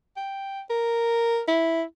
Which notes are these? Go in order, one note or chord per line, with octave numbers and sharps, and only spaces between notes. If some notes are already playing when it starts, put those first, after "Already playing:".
G5
A#4
E4